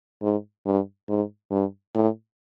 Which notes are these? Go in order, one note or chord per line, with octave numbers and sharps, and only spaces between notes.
G#2
G2
G#2
G2
A2